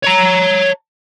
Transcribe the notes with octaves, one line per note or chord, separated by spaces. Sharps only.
C#5 A#5